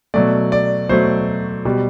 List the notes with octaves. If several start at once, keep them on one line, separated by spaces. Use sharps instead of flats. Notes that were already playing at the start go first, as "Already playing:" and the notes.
B2 F#3 A3 D5
D5
B2 F#3 A3 C5
B2 G3